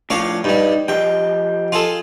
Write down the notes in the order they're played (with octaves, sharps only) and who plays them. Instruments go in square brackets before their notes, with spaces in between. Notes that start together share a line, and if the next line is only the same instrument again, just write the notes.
[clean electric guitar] A2 F3 [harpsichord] D4 C#5 F5
[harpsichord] G2 G3 [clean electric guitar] D#4
[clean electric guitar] F3 G4 D#5 [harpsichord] G5
[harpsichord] F4 G#4 A4